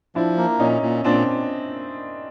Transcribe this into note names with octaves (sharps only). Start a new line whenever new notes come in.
F3 D4 E4
A#3
A#2 C#4 D#4
A#2
A#2 C4 D4